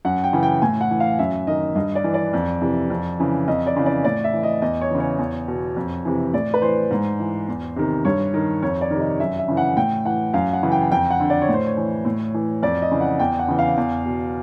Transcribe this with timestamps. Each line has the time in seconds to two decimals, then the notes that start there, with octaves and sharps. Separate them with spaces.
0.05 F#2 F#5
0.24 G5
0.33 C#3 E3
0.43 G5
0.62 A2 G#5
0.81 F#5
0.91 E3
1.00 F5
1.19 F#2 E5
1.47 D#3 D#5
1.75 G2 D#5
1.95 D5
2.04 E3
2.14 D5
2.33 F2
2.61 C3 E3
2.90 F2
3.20 C#3 E3
3.48 F2 D#5
3.66 D5
3.76 C#3 E3
3.86 D5
4.04 A2 D5
4.24 E5
4.34 E3
4.43 D#5
4.62 E2 D#5
4.81 C#5
4.91 C#3 E3
5.00 C#5
5.19 E2
5.48 B2
5.76 F2
6.05 C3 E3
6.33 A2 D5
6.54 B4
6.62 E3 C5
6.91 G#2
7.20 E3
7.48 E2
7.76 C3 D#3
8.05 G2 C#5
8.34 D#3
8.62 F2 C#5
8.81 D5
8.91 C3 D#3
9.00 D#5
9.20 F#2 E5
9.39 E5
9.48 C#3 E3
9.57 F#5
9.77 A2 G5
10.05 E3 F#5
10.34 F#2 F5
10.53 F#5
10.63 C#3 E3
10.72 G5
10.92 F2 G5
11.10 F#5
11.20 D3
11.30 D5
11.42 C#5
11.48 A2
11.54 C5
11.66 C#5
11.77 E3
12.05 A2
12.34 E3
12.63 F2 D5
12.82 D#5
12.91 C#3 E3
13.01 F#5
13.19 E2 G5
13.39 F#5
13.48 C#3 E3
13.59 F5
13.77 E2
14.05 B2